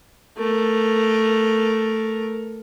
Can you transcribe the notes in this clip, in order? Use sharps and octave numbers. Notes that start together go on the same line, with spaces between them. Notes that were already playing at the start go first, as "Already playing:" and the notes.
A3 A#4